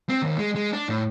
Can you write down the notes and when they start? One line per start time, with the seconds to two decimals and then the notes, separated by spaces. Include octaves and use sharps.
0.09 C4
0.22 D#2
0.38 G#3
0.55 G#3
0.73 D4
0.89 A2